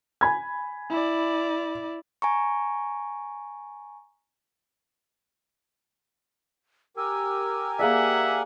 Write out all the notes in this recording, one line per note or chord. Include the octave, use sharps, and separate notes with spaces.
G#5 B5 G#6
E4 D5
G#5 A#5 C#6
G4 A#4 G#5 E6
A#3 G#4 D5 E5 F#5